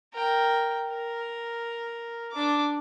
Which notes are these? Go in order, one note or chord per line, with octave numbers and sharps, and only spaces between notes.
A#4 G5
A#4
D4 D6